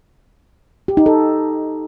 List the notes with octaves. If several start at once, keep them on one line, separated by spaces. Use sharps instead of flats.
G4
D#4
A4